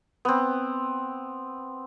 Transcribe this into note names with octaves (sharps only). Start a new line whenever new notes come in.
B3 C4